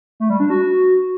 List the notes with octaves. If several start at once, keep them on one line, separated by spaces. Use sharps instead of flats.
A3
G3
D4
F#4